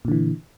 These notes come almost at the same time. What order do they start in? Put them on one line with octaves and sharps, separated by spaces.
A#2 D3 E3